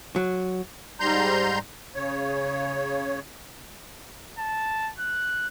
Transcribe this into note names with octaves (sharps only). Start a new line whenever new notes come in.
F#3
G#2 G3 A#5 C6 G6
C#3 C#5
A5
F#6